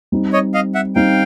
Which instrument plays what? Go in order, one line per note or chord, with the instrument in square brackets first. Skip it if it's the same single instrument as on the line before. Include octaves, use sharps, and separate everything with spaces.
[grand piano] G3 C4 D#4
[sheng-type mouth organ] C#5 D#5
D#5 F5
E5 F#5
[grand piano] G3 C4 D#4 [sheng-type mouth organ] F5 G5